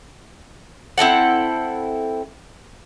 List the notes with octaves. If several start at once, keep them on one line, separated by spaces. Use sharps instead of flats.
C4 E4 A4 F#5